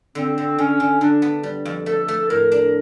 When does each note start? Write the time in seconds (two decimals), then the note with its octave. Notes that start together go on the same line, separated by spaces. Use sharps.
0.15 D3 C4
0.38 D3
0.58 D3 C#4
0.80 D3
1.01 D3 D4
1.22 B3
1.43 G3
1.65 F2
1.86 A3 A4
2.08 A3
2.29 A2 A#4
2.52 D4